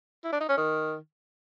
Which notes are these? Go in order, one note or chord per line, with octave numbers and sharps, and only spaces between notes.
E4
D4
D#4
C#4
D#3